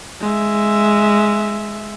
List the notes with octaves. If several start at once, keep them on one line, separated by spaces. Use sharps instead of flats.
G#3 E5